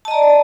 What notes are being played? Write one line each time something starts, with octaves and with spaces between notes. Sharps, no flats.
D5 D#5 A5 A#5